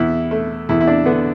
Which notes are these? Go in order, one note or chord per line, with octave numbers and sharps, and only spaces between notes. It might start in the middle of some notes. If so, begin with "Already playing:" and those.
Already playing: E2 E4
A3
E2 E4
E4
D4
D3 B3